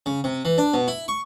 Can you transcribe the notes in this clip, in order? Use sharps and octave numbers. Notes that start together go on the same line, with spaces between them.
C#3
C3
E3
D4
B2
E4
C#6